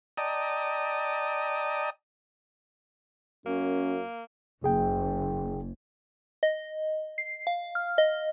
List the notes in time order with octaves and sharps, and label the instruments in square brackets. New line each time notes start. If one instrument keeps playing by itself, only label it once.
[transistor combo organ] D5 D#5 G5 A5 A#5 D#6
[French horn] F#2 [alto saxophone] A#3 [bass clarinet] C#4
[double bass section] F#1 [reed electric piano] G#4 G5
[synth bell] D#5
C7
F5
F6
D#5